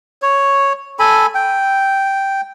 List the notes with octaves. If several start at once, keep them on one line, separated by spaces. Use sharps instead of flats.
C#5
A4 G#5 B5
G5